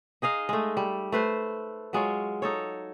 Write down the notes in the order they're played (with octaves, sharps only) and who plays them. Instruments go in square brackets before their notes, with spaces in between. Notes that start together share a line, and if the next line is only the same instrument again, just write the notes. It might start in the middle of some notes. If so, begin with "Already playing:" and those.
[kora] D#4 G#4 D#5 F5
G#3 A3
G3
A3 B4 C5
F#3 G#3 F4 C#5
D#4 A4 C#5